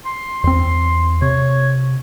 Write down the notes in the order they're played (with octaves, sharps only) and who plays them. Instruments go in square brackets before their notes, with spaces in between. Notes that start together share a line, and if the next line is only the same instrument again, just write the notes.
[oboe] C6
[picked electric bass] E2 C4 [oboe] C6
[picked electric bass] C3 [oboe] C#5